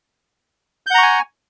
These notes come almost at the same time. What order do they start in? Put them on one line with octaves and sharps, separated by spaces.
G6 F#5 A#5 C#6 G#5